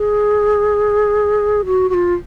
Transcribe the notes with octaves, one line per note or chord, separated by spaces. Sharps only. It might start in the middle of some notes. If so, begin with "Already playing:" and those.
Already playing: G#4
F#4
F#4
F4